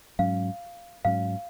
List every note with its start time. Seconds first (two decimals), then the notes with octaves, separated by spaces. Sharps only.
0.19 G#2 F#3 C#4 F5
1.05 G#2 F#3 C#4 F5